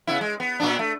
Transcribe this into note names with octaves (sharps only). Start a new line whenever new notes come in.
C#3 B3 E4
G#3
B3
A#2 B3 D4
A3